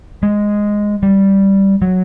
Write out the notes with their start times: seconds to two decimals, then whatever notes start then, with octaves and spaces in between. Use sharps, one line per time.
0.23 G#3
1.03 G3
1.82 F#3